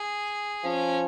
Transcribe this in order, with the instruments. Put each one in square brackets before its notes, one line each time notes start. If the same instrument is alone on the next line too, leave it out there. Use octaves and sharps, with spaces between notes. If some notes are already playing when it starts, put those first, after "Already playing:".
Already playing: [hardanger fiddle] G#4
[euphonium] F3 [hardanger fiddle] C#4